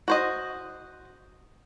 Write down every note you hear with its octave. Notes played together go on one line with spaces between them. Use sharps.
F#4 C5 D#5